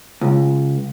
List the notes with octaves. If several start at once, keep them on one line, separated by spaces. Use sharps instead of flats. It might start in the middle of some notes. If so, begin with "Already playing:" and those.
C#2